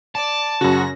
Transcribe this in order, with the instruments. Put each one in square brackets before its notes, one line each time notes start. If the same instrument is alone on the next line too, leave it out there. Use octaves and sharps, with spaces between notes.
[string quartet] D5 [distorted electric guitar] A5
[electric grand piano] F#2 C#3 [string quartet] C#4 A#6 [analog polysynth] F#4